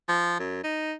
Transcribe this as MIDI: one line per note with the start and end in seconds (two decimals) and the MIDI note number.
0.09 0.37 53
0.39 0.59 42
0.64 0.94 63